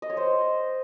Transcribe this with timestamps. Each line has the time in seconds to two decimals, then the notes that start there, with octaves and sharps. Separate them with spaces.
0.02 D#5
0.10 C#5
0.17 C5